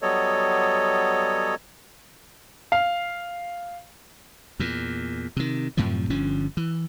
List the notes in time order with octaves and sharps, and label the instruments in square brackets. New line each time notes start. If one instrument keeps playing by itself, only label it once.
[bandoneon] F#3 G3 B3 A4 C#5 D#5
[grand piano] F5
[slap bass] E2 A#2
C3 D#3
F#2 A2 C3 F3
G1 D3 F3 C#4
E3